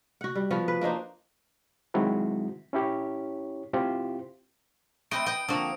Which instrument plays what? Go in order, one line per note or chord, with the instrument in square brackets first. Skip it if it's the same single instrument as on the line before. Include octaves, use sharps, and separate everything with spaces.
[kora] F#4 F#5
G3
F3 B3 F#4
B4
A#3 D4 D#4 C5
[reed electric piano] D#3 F#3 G#3 C4 E4 F#4
C#4 E4 G4 C#5
C4 E4 F4 G4 C5
[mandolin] A3 C4 B4 [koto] D#5 [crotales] D7
[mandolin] B4 G5 [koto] D#5
[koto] D3 F#4 [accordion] F3 A#3 C4 [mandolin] A#5 D#6